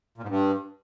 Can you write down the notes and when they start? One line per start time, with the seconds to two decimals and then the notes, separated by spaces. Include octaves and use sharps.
0.18 A#2
0.23 G#2
0.28 G2